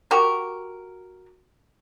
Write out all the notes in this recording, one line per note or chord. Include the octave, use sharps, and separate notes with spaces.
F#4 G4 A#4